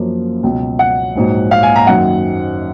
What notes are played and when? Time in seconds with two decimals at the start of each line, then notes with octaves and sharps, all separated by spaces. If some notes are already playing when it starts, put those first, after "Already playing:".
Already playing: F#2 F3 A#3 C#4
0.43 C#2 B2 F#3
0.79 F#5
1.16 A#1 G#2 F#3
1.51 F5
1.63 G#5
1.76 A#5
1.87 F#1 F#2 D#3 F#5